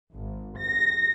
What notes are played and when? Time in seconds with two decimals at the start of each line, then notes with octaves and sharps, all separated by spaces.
0.14 G#1
0.59 A#6